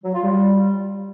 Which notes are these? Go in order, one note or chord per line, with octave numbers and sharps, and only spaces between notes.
F#3
F4
G3